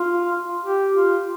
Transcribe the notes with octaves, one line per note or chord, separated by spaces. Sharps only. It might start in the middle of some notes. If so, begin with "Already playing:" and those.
Already playing: F4
G4
F4